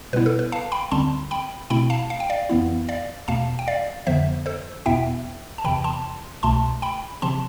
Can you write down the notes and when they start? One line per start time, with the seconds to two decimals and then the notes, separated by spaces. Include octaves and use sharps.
0.13 B2 G3 B3 E4 B4
0.26 A4
0.39 B4
0.52 F5 A5
0.72 G5 B5
0.91 D2 D3 G3 C4 A5 C6
1.31 G5 B5
1.70 B2 A3 C4 E4 G5 B5
1.90 F5 A5
2.10 F5
2.20 G5
2.30 D5 F5
2.49 F2 E3 B3 E4
2.89 D5 F5
3.28 E2 B2 A3 F5 A5
3.59 G5
3.68 D5 F5
4.07 F2 D3 F3 B3 C5 E5
4.46 A4 C5
4.86 E2 B2 B3 E4 E5 G5
5.58 A5
5.64 E2 C3 E3 G5 B5
5.84 A5 C6
6.43 C2 B2 A3 A5 C6
6.82 G5 B5
7.22 C3 F3 C4 A5 C6